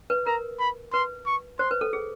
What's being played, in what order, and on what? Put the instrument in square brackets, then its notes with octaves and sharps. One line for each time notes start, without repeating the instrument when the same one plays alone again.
[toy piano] B4
[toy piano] A#4 [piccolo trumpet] A#5
[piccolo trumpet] B5
[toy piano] B4 [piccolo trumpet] C6
[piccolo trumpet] C#6
[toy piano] C5 [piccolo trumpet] C6
[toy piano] B4
A4
G#4